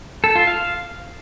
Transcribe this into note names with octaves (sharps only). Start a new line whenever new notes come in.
A4
F4
F5